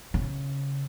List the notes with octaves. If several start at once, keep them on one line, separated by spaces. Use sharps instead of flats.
C#3